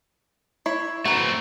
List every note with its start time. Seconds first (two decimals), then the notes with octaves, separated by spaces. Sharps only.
0.66 E4 C#5 E5
1.05 A3 C4 F#4 A#4 B4